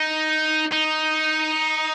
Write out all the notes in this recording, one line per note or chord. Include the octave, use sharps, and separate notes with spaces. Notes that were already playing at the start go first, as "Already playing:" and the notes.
Already playing: D#4
D#4